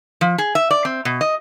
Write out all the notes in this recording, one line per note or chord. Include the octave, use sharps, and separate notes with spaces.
F3
G#4
E5
D5
C4
B2
D#5